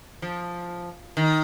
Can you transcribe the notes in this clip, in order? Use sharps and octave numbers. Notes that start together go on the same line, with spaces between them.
F3
D#3